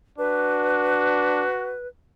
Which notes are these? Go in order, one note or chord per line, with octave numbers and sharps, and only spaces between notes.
D4 F#4 B4